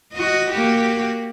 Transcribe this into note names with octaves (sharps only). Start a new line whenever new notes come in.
F#4 D#5
A#3 F#4 G4